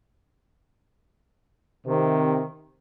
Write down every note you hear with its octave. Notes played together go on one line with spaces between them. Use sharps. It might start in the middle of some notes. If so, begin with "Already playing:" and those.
C3 D#3